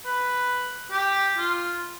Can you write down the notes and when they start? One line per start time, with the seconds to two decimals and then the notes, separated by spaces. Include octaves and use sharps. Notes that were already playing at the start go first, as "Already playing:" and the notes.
0.06 B4
0.91 G4
1.38 F4